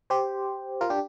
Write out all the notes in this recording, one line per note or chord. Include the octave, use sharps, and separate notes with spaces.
G4 C5
F4 A#4
D4 G4